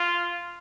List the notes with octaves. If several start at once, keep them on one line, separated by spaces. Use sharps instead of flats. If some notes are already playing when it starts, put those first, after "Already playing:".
Already playing: F4